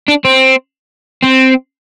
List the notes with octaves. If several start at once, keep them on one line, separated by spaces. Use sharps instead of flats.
D4
C4
C4